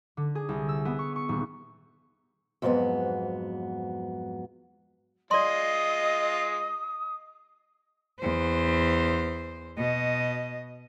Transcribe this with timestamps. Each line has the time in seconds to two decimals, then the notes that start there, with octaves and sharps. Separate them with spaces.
0.17 D3
0.35 G#4
0.49 C2
0.69 E6
0.85 B3
0.99 C#6
1.16 C#6
1.29 D#1
2.62 F2 G#2 F#3 B3
5.31 G#3 F4 D5 D#5 C6 D#6
8.20 E2 C5
9.77 B2 D#5